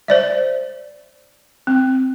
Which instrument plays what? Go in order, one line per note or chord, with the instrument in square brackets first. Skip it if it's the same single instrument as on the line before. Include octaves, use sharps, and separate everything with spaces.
[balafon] C5 D5 E5
C4